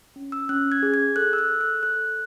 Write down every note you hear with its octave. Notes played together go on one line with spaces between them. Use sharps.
C#4
E6
C#4 F#6
G#6
G#4
G#6
A4 F#6
E6
F#6
A4
F#6
A4 F#6